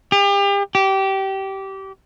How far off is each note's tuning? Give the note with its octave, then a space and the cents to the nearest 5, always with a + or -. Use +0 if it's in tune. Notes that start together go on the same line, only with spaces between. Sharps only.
G4 +35
G4 -20